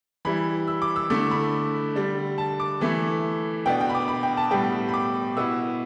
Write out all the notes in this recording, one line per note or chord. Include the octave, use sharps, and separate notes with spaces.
E3 G3 E4 B5
E6
D6
E6
D3 A3 E4 D6
B5
D3 G3 D4
A5
D6
E3 A3 E4
B2 B3 D4 G5
G5
B5
D6
B5
G5
A5
A2 G3 B3 G5
B5
D6
B2 B3 E4 E6